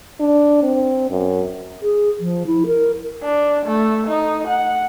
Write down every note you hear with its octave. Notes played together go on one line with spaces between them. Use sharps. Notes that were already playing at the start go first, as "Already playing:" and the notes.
D4
C4
F#2
G#4
F3
E4
A#4
D4
A3
D#4
F#5